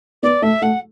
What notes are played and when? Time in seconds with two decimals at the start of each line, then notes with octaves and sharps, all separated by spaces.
0.23 B3 D5
0.42 A3 E5
0.62 A3 F#5